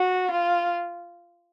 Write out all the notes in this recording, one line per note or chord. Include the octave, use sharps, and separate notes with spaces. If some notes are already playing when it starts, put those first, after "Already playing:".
Already playing: F#4
F4